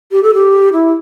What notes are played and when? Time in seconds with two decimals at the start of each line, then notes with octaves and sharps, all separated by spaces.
0.12 G4
0.23 A4
0.34 G4
0.73 E4